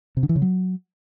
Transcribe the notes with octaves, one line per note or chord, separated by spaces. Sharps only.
C3
D3
E3
C#3
F#3